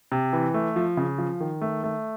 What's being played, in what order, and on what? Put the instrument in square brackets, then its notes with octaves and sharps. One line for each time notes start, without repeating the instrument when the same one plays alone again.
[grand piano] C3
E3
A3
F3
C#3
F3
D#3
A3
A3